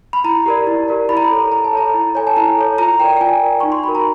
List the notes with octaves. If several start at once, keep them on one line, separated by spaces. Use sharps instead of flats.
B5
E4 A#5
G4 A#4 D5
E4
G4 A#4 D5
E4 B5
A#5
B5
A4 C#5
E4 A#5
A5
A4 C#5 A#5
E4
A4 C#5 G#5
A5
E4 A#5
A4 C#5
F4 A#5
A#4 D5 G5
G5
F4 G#5
A#4 D5
D#4 C#6
C6
F#4 A#4 B5
A#5